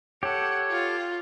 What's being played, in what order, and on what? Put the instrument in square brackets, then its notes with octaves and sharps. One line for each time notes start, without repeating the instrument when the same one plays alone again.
[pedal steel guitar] G4 A4 [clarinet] C#5 [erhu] F#5
[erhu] F4